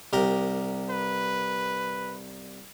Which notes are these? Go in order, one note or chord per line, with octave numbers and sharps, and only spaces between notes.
C2 G4 A#4
B4